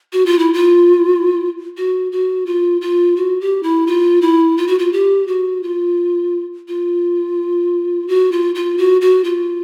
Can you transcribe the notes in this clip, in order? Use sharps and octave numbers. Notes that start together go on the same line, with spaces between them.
F#4
F4
E4
F4
F#4
F#4
F4
F4
F#4
G4
E4
F4
E4
F4
F#4
F4
G4
F#4
F4
F4
F#4
F4
F4
F#4
F#4
F4